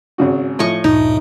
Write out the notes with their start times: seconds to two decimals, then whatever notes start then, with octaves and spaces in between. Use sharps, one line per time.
0.18 G#1 C#3 F#4
0.59 A2 F3 D#5 G#5 C#6
0.84 D2 G2 A#2 D#4